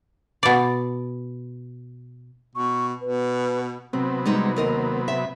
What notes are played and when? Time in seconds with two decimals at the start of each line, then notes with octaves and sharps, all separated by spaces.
0.43 B2 D5
2.55 B2 C#6
3.01 B2 B4
3.93 C3 F#3 B3 C4
4.25 G3 G#3 D#4
4.56 D#2 A#4 D#5
5.08 E5